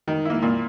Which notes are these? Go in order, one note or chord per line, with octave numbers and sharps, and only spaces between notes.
D#3
A#3 E4
A#2